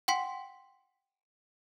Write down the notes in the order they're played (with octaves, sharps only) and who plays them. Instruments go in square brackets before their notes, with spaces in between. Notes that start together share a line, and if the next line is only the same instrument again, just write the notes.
[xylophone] F#5 G5 C6 B6